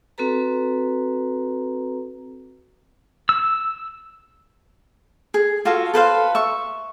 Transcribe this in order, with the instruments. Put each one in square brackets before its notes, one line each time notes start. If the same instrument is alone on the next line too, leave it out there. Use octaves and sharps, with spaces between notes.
[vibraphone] C4 F#4 A4 B4 A#5
[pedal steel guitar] E6
[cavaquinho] G#4
F4 F#4 A4 F5
A4 B4 C5 F5
E5 C#6